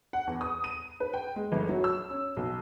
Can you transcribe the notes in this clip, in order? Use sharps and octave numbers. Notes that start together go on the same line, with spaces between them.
F#5
E2
D#6
D#7
B4
G5
G#3
G1
F#3
E6
C#4
B1